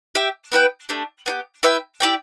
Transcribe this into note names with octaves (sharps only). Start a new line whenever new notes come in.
G4 E5 G5
B3 E4 B4 G5
A3 D4 G4
B3 D4 G4
E4 B4 E5 G5
E4 G4 D5 G5